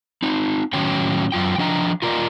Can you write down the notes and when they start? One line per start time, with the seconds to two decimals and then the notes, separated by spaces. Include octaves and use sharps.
0.22 C4 D#4
0.73 A2 D#3 F#3 C#4 C#5 G5
1.32 F#2 A#3 F4 G5
1.58 F3 D4 D#5 G5 A#5
2.02 F4 A#4 C5 D5 D#5